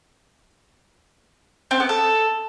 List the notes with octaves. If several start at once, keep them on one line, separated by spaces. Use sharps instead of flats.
C4
B3
A4